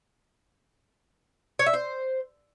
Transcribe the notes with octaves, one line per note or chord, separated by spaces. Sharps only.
C#5
E5
C5